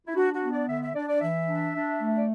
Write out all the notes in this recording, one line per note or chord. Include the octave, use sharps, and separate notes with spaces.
E4
D4 F#4
F#4
B3
D5
D3 E5
E5
D4 D5
D5
E3 E5
D4
D4
A3
D5